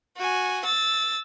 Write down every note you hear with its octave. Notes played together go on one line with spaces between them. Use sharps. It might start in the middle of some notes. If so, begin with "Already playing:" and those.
F#4 G#5
E6 A6